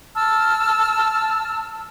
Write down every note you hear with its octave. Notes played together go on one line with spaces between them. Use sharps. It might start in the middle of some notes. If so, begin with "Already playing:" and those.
A5 E6 F6